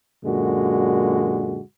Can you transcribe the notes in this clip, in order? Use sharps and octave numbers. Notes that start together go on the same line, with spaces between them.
F#2 A#2 D3 G#3 F#4